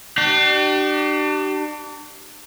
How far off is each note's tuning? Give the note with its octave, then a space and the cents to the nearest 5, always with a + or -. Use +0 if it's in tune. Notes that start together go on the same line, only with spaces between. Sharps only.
D4 +35 G4 -35